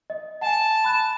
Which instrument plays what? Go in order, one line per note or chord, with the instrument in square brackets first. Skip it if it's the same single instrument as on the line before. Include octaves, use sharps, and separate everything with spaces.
[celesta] D#5
[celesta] F#5 G#5 [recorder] A5
[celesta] B5 F#6